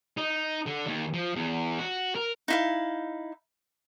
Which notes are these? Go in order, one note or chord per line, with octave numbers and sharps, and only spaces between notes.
D#4
D3
D#2
F3
E2
F#4
A#4
D#4 E4 F5